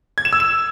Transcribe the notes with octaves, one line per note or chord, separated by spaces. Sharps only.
G#6
E7
E6
E7